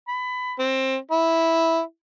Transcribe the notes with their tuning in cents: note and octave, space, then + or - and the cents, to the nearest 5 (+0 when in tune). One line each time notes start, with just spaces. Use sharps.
B5 +20
C4 +20
E4 -5